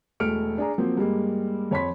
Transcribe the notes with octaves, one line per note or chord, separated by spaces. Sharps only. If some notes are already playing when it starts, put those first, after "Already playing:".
E1 A3 F6 C#7 D7
D4 G#4 A#5
F3 F#3 A#3 C4
G2 G3 G#3 A#3
F2 C#5 B5 C6 B6